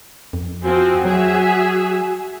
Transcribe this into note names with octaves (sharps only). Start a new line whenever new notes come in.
F2
F3 C4 F#4 G#5
F#3 G#4 E5